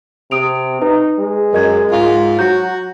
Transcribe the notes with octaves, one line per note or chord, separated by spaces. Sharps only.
C3 D#6 D7 F7
D#4 B4
G#3
F#2 A#4 D#5 G#6
G#2 F4
F#3 F#4 A#5 G6